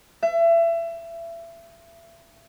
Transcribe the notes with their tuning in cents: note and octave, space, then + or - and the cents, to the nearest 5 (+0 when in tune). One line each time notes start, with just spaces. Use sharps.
E5 +30